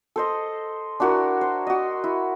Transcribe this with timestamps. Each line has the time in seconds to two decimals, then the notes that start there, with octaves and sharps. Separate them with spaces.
0.16 A4 C5 D#5
1.00 D4 E4 F#4 A#4
1.41 C5
1.67 F#4 D#5
2.04 E4